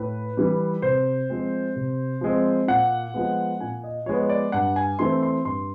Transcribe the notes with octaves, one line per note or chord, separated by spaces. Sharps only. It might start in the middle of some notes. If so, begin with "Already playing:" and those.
Already playing: A2 B4
E3 G3
C3 C5
F3 G#3 C4
C3
F3 G#3 C4
A#2 F#5
F3 G#3 B3
A#2 G#5
D#5
F3 G#3 B3 C#5
D5
G2 F#5
G#5
E3 A3 C4 C6
C6
G2 C6